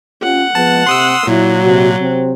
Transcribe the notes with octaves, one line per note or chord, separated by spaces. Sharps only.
C#4 F4 G4 F#5
F3 G#3 B3 A5
C3 C6 D#6 E6
A#2 F#3 E4
C3 F#4
C3 C4